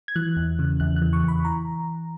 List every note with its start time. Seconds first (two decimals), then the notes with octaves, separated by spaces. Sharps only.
0.08 G#6
0.16 E3 F#6
0.37 E2
0.59 C#3
0.80 E2 F#6
0.96 F#6
1.02 E3
1.13 C#6
1.24 E2 B5
1.45 E3 A#5